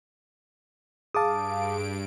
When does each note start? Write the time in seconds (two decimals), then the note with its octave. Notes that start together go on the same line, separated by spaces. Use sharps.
1.15 G2 G#4 F5 A5 D6 D#6 D7